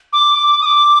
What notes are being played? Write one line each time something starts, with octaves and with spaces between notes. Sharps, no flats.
D6
D6
D#6
D6